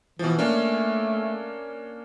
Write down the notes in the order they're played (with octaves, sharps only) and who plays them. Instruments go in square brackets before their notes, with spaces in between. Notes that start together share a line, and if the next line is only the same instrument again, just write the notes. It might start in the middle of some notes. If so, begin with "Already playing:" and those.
[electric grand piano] B2 F3 [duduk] E3
[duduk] A3 [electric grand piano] A#3 C#4 D4